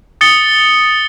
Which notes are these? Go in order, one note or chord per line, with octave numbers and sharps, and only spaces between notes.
D#6 A6 C#7 G7